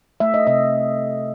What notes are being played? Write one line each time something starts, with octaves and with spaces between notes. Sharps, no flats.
A3 E5
D#5
C3 D#5